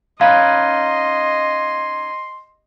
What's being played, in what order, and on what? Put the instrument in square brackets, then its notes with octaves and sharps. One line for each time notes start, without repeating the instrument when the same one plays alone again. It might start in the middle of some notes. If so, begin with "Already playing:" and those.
[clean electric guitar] C#4 D#4 B4 [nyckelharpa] D#5 [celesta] F5 [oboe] C6